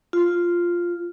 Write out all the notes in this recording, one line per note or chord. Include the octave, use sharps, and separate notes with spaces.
F4